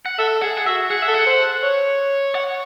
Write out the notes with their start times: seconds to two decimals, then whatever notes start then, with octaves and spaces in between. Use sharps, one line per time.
0.06 F#5
0.18 A4 E5
0.42 G#4 F#5
0.57 F#5
0.66 F#4 E5
0.90 G#4 F#5
1.02 E5
1.08 A4
1.14 F#5
1.26 C5
1.63 C#5
2.35 F#5